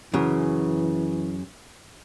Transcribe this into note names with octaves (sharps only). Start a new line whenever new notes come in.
F#2 C#3 E3